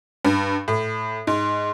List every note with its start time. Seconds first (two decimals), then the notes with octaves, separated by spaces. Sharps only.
0.25 G2
0.68 A2
1.27 G#2